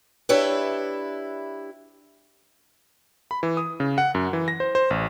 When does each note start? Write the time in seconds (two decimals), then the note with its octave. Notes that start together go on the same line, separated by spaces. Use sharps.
0.29 D4 E4 G4 B4 C#5 E5
3.31 B5
3.43 E3
3.57 D#6
3.80 C#3
3.98 F#5
4.15 F#2
4.33 E3
4.48 A#6
4.60 C5
4.75 C5
4.90 A1